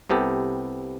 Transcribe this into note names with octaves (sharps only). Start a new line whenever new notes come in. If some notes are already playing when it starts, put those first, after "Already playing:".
C2 C3 B3 G4 A4